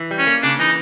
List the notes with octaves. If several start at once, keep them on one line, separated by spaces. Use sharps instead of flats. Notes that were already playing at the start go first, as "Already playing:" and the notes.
Already playing: E3
G3
C#4
A#3
C#3 D4
E3 D#4